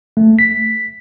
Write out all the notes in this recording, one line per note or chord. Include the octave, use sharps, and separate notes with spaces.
A3
B6